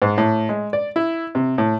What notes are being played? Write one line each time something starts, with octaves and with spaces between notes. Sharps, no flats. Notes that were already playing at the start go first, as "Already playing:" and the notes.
G#2
A2
G#3
D5
E4
C3
A2